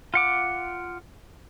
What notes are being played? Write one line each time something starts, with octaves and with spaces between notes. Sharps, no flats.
F4 F#5 D6